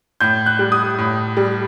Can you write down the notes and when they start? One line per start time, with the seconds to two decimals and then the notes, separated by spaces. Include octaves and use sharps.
0.20 A2 G6
0.46 F#6
0.59 G3
0.72 D#6
0.98 A2
1.37 G3